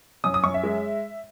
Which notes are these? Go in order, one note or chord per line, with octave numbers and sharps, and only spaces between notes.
F#2 D#6
D#6
F#2 C#6
E5
G#3